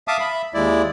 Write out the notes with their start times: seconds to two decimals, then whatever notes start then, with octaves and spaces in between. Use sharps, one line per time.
0.08 E5 F5 A5 D6 D#6
0.20 E5 B5
0.54 D#2 G#3 E4 D5